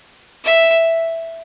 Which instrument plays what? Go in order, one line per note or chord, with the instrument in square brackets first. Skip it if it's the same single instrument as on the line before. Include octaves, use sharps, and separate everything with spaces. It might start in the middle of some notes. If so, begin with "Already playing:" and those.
[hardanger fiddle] E5